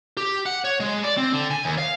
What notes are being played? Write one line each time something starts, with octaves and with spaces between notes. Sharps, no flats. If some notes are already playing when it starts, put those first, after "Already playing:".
G4
F#5
C#5
G#3
D5
C4
D3
G#5
D#2
F5